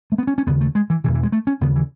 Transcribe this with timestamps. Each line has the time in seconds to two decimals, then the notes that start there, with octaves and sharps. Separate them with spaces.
0.12 A3
0.18 B3
0.27 C#4
0.38 C#4
0.46 D#2 C#3 B3
0.61 A3
0.75 G#3
0.90 E3
1.04 B2 E3
1.07 E2
1.14 E3
1.23 G#3
1.32 A3
1.47 C#4
1.61 D#2 C#3 B3
1.76 E3